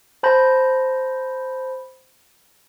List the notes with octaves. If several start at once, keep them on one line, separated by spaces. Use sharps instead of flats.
C5 A5 B5 G6 A#6